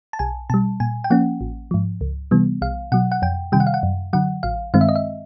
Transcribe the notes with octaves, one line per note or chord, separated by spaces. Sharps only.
A5
B1 G#5
B2 G3 A5
A#2 G#5
G5
F3 A#3 C#4 F#5
A1
G#2 F3
C#2
C3 E3 G3 B3
B1 F5
B2 F#3 F#5
F#5
F2 G5
C3 D#3 G3 G5
F#5
F5
F#5
F#2
D3 F#3 F#5
A1 F5
G2 D#3 G#3 C4 F5
E5
D#5
E5